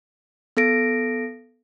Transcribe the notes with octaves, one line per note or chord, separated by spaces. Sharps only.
B3 A4 A#6 D7